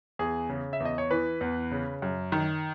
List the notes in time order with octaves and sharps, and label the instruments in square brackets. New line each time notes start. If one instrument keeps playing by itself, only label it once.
[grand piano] E2 G#4
C#3
E5
E2
D#5
C#5
E3 B4
E2
C#3
F#2
D#3